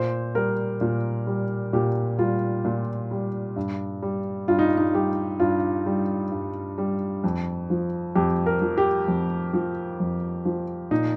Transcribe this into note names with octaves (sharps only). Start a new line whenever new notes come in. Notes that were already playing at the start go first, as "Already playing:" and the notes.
Already playing: A#2 C5
G3 A#4
A#2
G3
A#2 G4
G3 F4
A#2
G3
G2
G3
G2 F4
D#4
D#4
G3 G4
G2 F4
G3
G2
G3
F2
F3
F2 G4
A#4
F3
G4
F2
F3
F2
F3
A#2 D#4